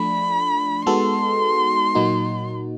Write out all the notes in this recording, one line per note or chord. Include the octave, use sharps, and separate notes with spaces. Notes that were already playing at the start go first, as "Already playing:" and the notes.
Already playing: F3 A3 D4 B5
G#3 B3 D#4 F#4 A4 C6
A#2 F#3 A#3 D#4 F#4